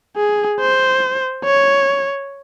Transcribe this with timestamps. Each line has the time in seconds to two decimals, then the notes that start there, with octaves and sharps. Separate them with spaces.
0.16 G#4
0.59 C5
1.45 C#5